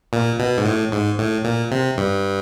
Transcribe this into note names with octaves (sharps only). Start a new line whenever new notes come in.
A#2
B2
G#2
A2
G#2
A2
A#2
C3
G2